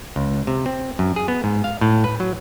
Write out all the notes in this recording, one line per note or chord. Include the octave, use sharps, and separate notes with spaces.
C#2
C3
C4
F#2
G#4
B3
G#2
F5
A2
B4
F#3